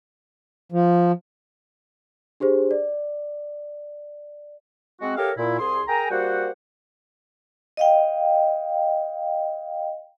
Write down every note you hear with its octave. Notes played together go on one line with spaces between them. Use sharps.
F3
D4 G4 G#4 C5
D5
G#3 C4 F#4
G4 A4 A#4 C#5 E5 F5
A#2 E4
C2 G#4 C6
G#4 A#4 G5 G#5 A#5
G3 A#3 F#4 C5 F#5 G5
D#5 F5 G5